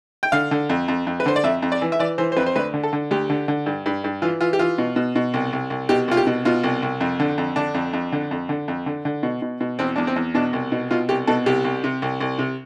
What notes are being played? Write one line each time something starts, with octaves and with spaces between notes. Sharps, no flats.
G5
D3 F5
D3
F2
F2
F2
B4
D3 C5
D5
F2 E5
F2
D5
E3
E5
E3 D5
E3 C5
C5
F2 B4
C5
D2 B4
D3
A4
D3
D2 G4
D3
D3
G2
G2
G2
E3 F4
E3 F4
G4
E3 F4
B2
B2
B2
C2
C2
C2
B2 G4
C2 F4
G4
B2
B2 F4
C2
C2
F2
D3
F2
D3 D4
F2
F2
D3
F2
D3
F2
D3
D3
B2
B2
B2
E2 C4
E2 D4
C4
E2
B2 D4
C2
B2
B2 F4
C2 G4
B2 A4
C2 G4
C2
C3
C2
C2
C3